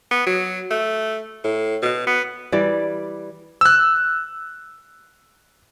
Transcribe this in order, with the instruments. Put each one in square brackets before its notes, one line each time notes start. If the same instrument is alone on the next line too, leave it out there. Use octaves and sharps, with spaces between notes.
[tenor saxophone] B3
F#3
A3
A2
B2
B3
[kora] E3 G3 D5
[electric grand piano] E6 F#6